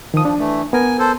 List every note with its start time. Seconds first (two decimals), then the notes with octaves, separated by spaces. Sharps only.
0.14 D#3 F3 D#6
0.25 D4
0.39 E3 A3
0.73 B3 A#4 G#5
0.99 A4 C5